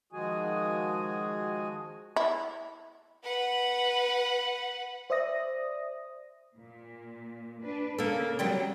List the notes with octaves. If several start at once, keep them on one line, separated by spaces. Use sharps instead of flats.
D#3 F3 G#3 F#4 G#4 G#5
E4
B4 F#5
C5 D5 E5 D#6 A#6
A#2
D4 B4
C#3 A#3 A4
F#3 G3 C4